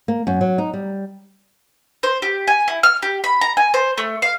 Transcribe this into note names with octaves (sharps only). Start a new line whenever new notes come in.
A#3
F#2
F#3
D#4
G3
C5
G4
G#5
E4
F6
G4
B5
A#5
G#5
C5
A3
F5